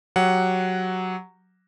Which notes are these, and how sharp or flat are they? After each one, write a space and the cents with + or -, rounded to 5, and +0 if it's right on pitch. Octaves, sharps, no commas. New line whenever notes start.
F#3 +0 G4 +0 F#5 +0